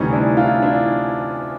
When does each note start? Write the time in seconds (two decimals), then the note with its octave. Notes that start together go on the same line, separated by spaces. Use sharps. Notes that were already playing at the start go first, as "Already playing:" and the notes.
Already playing: D2 C3 E3 G3 C#4 D#4
0.12 D4 E4
0.37 D#4 F4
0.62 D4 E4